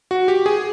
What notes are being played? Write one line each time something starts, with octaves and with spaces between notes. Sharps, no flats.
F#4
G4
G#4